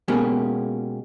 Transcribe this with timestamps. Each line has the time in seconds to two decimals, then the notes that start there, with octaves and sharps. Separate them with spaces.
0.08 B2 G#3 A#3 B3 C#4 G4